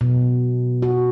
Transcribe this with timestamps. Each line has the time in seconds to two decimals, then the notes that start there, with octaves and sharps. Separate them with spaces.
0.01 B2
0.82 F#4